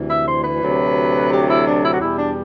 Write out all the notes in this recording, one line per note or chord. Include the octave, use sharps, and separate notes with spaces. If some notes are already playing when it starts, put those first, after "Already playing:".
Already playing: D2 C3 E3
E5
C5
B4
D2 C3 F#3
G4
E4
D4
E4
F#4
E2 B2 G3 E4
D4